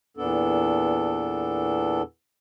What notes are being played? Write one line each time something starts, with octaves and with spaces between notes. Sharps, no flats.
E2 A#2 B3 D4 A4